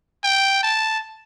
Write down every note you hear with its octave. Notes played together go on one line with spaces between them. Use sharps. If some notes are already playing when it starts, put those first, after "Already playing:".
G5
A5